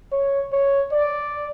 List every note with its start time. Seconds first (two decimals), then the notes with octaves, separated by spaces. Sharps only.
0.12 C#5
0.52 C#5
0.92 D5